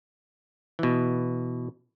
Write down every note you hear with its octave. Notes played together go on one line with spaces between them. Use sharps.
B2 E3